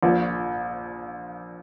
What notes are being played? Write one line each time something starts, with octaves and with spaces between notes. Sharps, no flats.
A#1 A#2 F3